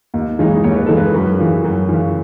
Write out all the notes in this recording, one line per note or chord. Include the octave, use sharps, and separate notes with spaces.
D#2
C#3 E3 G#3 D#4
D#2 C#5
B4
C#3 E3 G#3 D#4 A4
B4
F#2
C#3 E3
F#2
C#3 E3